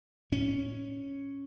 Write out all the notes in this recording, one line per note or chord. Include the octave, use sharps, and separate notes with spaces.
A2 C#4